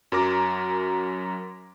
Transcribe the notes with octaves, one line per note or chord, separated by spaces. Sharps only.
F#2 F#3 A#4 A#5 D6 A#6